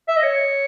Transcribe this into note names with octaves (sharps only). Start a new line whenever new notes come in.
E5
D#5
C#5